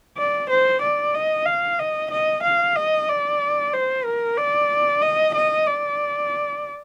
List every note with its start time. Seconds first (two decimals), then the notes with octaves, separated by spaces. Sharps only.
0.18 D5
0.50 C5
0.82 D5
1.15 D#5
1.46 F5
1.79 D#5
2.11 D#5
2.43 F5
2.76 D#5
3.09 D5
3.73 C5
4.05 A#4
4.38 D5
5.02 D#5
5.34 D#5
5.66 D5